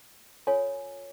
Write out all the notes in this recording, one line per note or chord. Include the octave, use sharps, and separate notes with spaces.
F4 A4 C#5 G#5